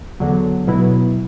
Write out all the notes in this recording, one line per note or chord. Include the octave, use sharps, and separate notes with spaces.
E2 D3 F#3
B2 F#3 B3 E4